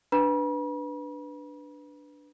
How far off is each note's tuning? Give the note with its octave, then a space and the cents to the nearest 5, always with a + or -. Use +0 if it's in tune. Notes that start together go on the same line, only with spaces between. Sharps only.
D4 +0 B4 +0 B5 -45